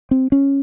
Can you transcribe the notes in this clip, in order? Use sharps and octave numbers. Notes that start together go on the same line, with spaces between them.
C4
C#4